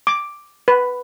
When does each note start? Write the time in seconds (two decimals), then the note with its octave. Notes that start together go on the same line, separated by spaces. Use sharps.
0.07 D6
0.68 B4